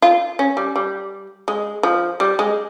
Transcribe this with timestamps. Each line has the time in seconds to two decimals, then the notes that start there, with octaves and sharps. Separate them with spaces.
0.02 F4
0.39 C#4
0.57 G3
0.76 G3
1.48 G#3
1.83 F3
2.20 G3
2.39 G#3